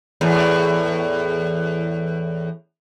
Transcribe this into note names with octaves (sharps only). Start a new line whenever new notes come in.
E2 A2